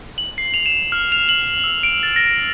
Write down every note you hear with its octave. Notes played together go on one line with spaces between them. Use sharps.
F#7
C7
F7
E7
F6
F7
F#7
E6
D7
A6
A#6